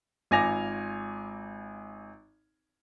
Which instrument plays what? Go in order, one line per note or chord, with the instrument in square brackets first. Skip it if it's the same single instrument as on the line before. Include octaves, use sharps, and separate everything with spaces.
[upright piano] G#1 F4 G#5 D6 A#6 F7